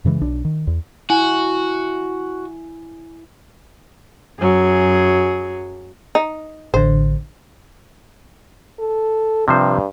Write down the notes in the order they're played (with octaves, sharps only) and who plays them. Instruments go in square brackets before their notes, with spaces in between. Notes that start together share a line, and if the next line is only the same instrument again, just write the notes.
[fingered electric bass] F#2 C#3 E3 G#3
B1 D4
D#3
E2
[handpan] E4 [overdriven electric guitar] F#4 [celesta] G#5
[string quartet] F#2 F#3 G#4
[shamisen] D#4
[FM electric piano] A1 D3 [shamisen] C5
[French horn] A4
[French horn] G2 [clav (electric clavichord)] C3 F3 C5